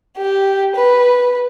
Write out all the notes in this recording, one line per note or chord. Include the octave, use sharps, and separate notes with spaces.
G4
B4